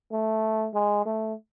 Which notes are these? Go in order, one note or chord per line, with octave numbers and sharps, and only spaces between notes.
A3
G#3
A3